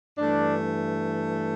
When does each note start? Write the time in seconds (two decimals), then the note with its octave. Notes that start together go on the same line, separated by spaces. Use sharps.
0.17 G2 E3 A3 D4